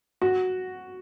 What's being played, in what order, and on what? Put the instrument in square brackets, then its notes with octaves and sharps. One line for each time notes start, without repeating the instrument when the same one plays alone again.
[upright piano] F#4